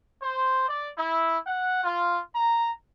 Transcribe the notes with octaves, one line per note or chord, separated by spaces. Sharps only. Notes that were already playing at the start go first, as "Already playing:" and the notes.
C5
D5
E4
F#5
F4
A#5